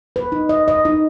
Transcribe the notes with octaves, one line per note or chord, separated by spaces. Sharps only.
B4
D#4
D#5
D#5
D#4